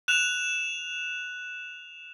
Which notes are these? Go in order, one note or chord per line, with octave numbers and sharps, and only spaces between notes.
F#6 E7 F7